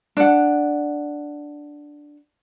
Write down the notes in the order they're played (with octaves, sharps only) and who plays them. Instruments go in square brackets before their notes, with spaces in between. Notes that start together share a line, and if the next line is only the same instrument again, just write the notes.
[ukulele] D4 F#5